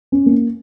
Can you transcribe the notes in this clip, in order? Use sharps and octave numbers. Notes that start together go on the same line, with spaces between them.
C#4
A#3